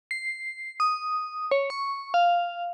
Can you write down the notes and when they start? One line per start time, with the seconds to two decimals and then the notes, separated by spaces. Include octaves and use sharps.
0.11 C7
0.80 D#6
1.51 C#5
1.70 C#6
2.14 F5